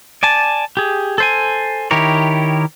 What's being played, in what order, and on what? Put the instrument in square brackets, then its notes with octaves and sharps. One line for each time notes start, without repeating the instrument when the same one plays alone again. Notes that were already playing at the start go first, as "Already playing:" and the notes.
[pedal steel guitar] D5 G#5 A5
G4 G#4
A4 C5 G#5
D#3 E4 G4 A#4 C#5